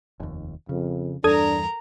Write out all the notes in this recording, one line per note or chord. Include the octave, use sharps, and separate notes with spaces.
F1 D#2
F2 C#3
E2 G2 D4 A4 A#4 A#5 D#6 G#6